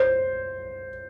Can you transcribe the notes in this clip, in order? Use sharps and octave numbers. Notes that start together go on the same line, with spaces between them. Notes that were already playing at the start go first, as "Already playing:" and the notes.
Already playing: C5